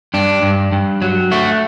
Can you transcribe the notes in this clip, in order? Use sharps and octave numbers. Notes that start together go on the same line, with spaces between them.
G2 D4
G2
G2
F#3
A3 F#4